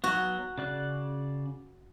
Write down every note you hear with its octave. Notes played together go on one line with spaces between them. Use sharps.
F#3 B3 F#4
C#3 D5 F#6